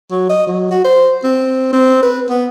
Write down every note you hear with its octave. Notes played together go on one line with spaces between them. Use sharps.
F#3
D#5
F#3
F#4
C5
C4
C4
B4
B3